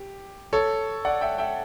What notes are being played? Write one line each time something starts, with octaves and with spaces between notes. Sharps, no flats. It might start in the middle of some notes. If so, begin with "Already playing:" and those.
Already playing: G4
A4 C#5
D5 F#5
E5 G5
E5 G5